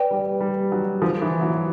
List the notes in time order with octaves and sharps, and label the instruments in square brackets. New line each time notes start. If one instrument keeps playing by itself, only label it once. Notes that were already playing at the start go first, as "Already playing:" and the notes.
Already playing: [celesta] B4 D5 G5
[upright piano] G3
G3
F#3
F3
E3
F#3